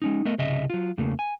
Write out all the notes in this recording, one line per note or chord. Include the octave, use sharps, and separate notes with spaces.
G#3 C#4 D#4
A3 B3 A#4 D#5
C2 C#3 D#5 E5
F#3 F4
E2 C#3 A3 A#3
G#5